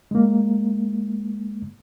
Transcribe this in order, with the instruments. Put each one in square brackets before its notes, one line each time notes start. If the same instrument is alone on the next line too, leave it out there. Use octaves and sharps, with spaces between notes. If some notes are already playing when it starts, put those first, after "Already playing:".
[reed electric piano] G#3 A#3